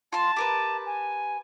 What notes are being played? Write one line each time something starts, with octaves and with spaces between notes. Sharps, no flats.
F4 A5 C6
G4 A#4 B4
G#5